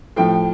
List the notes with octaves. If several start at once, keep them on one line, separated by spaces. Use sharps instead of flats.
A2 F3 G5